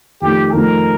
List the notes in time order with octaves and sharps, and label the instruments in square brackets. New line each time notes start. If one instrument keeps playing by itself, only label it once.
[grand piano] F2 D#3 A3 [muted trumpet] G4
[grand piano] F2 D#3 A3 [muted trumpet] A#4